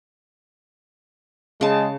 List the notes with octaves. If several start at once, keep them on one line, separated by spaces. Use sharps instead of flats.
C#3 G#3 A5